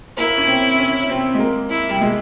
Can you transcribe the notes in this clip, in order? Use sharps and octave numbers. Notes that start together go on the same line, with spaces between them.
A#3 E4
C#4
C4
C#4
C4
G#3
A#3
E4
G3
G#3